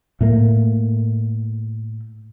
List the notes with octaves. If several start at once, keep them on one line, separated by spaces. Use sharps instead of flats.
A2 A3 A#3